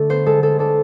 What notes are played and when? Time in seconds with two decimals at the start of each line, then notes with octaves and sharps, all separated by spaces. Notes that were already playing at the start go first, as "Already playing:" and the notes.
Already playing: D3 A3 A4
0.09 B3 C5
0.26 G#3 A4
0.43 G#3 A4
0.59 D4 A4